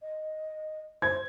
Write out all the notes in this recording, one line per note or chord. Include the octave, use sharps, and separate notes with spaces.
D#5
C5 G#6